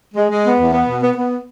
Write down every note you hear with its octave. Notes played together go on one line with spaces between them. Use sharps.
G#3
G#3
B3
E2
B3
B2
B3
B3